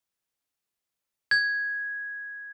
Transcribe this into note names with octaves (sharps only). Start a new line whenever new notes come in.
G#6